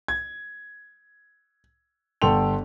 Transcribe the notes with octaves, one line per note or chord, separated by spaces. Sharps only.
G#6
G1 A4 G5 C6 F7